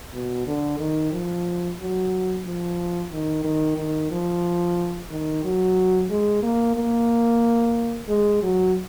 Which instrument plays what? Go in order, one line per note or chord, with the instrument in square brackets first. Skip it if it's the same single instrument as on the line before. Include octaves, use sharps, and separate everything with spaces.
[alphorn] B2
D3
D#3
F3
F#3
F3
D#3
D#3
D#3
F3
D#3
F#3
G#3
A#3
A#3
G#3
F#3